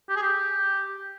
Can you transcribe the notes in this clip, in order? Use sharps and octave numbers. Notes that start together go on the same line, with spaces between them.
G4
G#4
G4